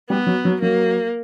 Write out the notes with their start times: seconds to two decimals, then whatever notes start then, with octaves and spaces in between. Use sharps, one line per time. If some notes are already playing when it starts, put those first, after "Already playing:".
0.09 G3 B3
0.27 F#3
0.45 F#3
0.61 F#3 A#3